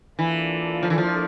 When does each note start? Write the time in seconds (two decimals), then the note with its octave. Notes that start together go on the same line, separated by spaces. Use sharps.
0.18 E3 A#3 D4 F4 A4 D5
0.83 F3
0.90 E3
0.98 F3